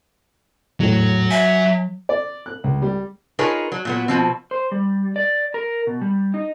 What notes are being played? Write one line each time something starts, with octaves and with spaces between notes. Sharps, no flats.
E2 A2 F#3
E5 G#5
D5
F#6
C#2
G3
D#4 F4 G#4 A#4 B4 C#5
F#3
A#2 F#3 B3
B2 F3 C4
C5
G3
D5
A#4
B2
G3
D#4